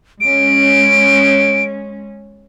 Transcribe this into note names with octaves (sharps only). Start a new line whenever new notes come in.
G#3 C#4 D7